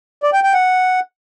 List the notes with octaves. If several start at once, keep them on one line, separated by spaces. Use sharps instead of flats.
D5
G5
G5
F#5